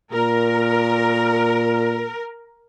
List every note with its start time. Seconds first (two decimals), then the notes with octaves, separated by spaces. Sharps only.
0.13 A#2 A#4